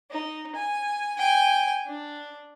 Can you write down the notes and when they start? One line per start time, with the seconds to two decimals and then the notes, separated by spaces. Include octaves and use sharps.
0.11 D#4
0.55 G#5
1.18 G5 G#5
1.86 D4